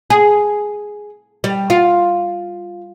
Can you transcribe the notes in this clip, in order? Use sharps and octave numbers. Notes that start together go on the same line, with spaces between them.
G#4
G3
F4